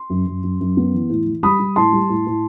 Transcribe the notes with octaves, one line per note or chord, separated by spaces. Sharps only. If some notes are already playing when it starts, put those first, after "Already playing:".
Already playing: C6
F#2
F#2
F#2
F#2
B3
E3
A2
E3
G3 B5 D#6
G3
A2 A5 C6
G3
A2
A2